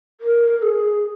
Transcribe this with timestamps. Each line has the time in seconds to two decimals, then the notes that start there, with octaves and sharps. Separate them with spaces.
0.21 A#4
0.62 G#4